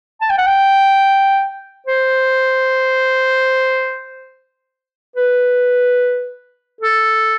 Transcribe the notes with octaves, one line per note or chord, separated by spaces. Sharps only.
A5
G5
F#5
G5
C5
B4
A4